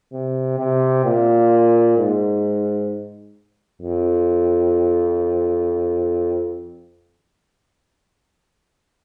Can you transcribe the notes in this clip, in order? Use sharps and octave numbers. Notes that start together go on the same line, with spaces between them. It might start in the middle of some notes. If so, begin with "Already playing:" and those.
C3
C3
A#2
G#2
F2